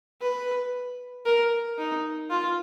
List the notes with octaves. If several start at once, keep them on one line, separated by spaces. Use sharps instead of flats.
B4
A#4
D#4
F4